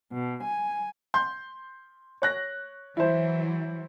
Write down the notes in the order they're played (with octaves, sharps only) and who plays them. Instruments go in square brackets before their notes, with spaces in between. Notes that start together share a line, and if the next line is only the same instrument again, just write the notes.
[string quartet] B2
G#5
[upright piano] C6 G6
C#5 F#6 A#6
[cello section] E3 F#3 [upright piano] E4 C5